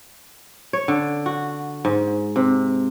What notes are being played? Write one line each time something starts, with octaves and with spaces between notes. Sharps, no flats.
C#5
D3
F#4
G#2
C3